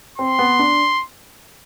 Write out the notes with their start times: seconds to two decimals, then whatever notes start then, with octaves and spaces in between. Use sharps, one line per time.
0.18 C4 C6
0.39 B3
0.59 D4